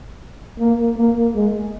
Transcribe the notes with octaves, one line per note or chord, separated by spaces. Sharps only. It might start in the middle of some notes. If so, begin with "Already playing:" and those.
A#3
A#3
G#3